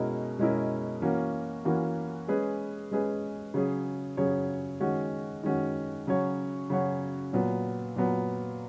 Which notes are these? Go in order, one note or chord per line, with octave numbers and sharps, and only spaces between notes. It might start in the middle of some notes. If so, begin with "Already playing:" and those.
Already playing: B2 G#3 C#4 E4 A#4
B2 G#3 C#4 E4 A#4
E3 A#3 C#4 F#4 A#4
E3 A#3 C#4 F#4 A#4
G#3 C#4 G#4 B4
G#3 C#4 G#4 B4
C#3 F#3 C#4 G#4 C#5
C#3 F#3 C#4 G#4 C#5
D#3 G#3 C#4 F#4
D#3 G#3 C#4 F#4
C#3 F#3 C#4 F#4 C#5
C#3 F#3 C#4 F#4 C#5
A#2 F#3 B3
A#2 F#3 B3